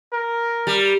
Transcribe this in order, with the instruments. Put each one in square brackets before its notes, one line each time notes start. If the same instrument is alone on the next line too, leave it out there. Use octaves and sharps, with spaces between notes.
[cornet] A#4
[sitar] G3